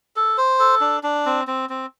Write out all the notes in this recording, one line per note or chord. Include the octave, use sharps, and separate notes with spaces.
A4
C5
A4
D4
D4
C4
C4
C4